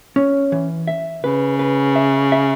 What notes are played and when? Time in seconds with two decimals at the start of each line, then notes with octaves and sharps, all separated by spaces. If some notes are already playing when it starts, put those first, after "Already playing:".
0.16 C#4
0.52 E3
0.87 E5
1.24 C#3 B4
1.59 B4
1.96 E5
2.32 E5